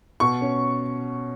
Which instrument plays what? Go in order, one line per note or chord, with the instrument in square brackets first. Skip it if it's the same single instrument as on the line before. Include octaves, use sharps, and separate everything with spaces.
[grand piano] B2 C#6
C#4